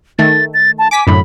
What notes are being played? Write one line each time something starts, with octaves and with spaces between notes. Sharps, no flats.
D#3 A3 A6
A6
A5
G#5 D6 B6
F#2 A2 D3 B5